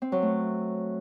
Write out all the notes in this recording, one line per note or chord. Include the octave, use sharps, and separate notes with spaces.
C4
F#3
A3